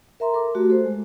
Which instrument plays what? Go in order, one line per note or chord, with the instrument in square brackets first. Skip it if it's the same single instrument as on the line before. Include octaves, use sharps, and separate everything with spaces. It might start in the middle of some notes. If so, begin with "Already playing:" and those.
[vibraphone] A#4 E5 A#5 C6
A4 A#4 D6
A3 F#4 G4
A4 C5
G#3